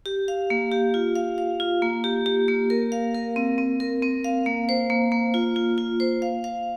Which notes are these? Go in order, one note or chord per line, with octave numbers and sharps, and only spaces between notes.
G4
F5
A#3
G4
F4
F5
F5
F4
A#3
G4
G4
A#3
A#4
F5
A#4
C4
C4
A#4
C4
F5
A#3
C5
A#3
A#3
F4
F4
F4
C5
F5
F5